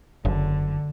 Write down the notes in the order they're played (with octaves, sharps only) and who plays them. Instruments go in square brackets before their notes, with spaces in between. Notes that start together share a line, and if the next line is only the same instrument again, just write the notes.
[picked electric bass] F#1 [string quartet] D3